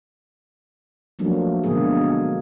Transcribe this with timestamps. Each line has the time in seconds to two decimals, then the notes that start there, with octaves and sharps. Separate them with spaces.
1.19 F3 F#3 A3 A#3 D4
1.63 B2 D3 G#3 A#3 G#4